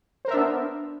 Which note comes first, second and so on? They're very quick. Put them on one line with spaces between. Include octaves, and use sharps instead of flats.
C5 A#4 E5 D4 B3